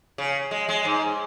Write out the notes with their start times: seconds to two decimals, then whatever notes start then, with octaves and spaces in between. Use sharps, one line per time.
0.18 C#3
0.51 G#3
0.69 G#3
0.85 G#2